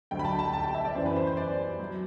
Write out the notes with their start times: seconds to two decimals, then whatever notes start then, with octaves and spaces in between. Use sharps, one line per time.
0.11 D2 D3 F#3 G5
0.19 B5
0.25 A5
0.39 A5
0.53 A5
0.63 G5
0.75 E5
0.85 D5
0.95 F#2 E3 C5
1.06 B4
1.16 C5
1.27 C5
1.37 D5
1.79 F#3